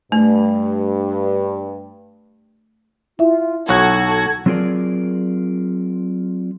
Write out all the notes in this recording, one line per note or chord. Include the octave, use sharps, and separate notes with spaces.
G2 A3
E4 F4 E5
B1 F#4 A4 C#5 F#5 A5 G#6
F#3 C4 F4 G#4 A#4 D5